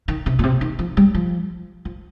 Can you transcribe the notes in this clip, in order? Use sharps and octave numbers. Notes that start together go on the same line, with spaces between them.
D#3
C3
A#2
C3
D#3
F3
G3
F3
F3